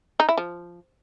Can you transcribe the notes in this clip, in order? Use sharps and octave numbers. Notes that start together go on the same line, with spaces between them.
D#4
E4
F3